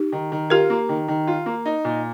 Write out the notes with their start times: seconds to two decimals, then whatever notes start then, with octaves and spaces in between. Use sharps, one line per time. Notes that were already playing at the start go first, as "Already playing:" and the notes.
Already playing: D#4 G4
0.12 D#3
0.32 D#3
0.50 F4 G4 A#4
0.70 A#3
0.89 D#3
1.08 D#3
1.27 F4
1.46 A#3
1.65 D#4
1.84 A#2